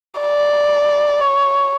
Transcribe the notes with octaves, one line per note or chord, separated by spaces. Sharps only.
D5
C#5